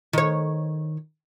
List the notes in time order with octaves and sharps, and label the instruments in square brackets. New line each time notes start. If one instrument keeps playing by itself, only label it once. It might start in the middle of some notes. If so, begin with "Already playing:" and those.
[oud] D#3 C#5